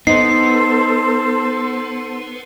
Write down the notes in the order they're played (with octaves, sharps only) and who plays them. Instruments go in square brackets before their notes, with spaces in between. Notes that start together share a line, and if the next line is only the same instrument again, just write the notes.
[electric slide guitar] B3 [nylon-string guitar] D#4 [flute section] A4 C5 [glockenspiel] C7